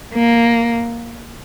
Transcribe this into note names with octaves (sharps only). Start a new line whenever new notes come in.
A#3